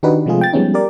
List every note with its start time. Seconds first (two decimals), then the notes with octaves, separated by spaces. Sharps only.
0.03 D#3 D4 D#4 F#4 G4 B4
0.26 C3 F3 G#3 A3 F4 G#4
0.41 G5 A6
0.53 F3 G3 G#3 B3 C#4 D#4
0.74 G4 A#4 D5